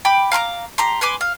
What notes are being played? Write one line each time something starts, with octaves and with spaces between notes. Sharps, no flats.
G5 B5 D6
F5 A#5 C6 D6
G4 A#5 C6
B4 G#5 C6 D6
F5